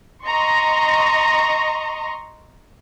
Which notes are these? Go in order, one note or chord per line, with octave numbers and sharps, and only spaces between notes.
D#5 A#5 C6 C#6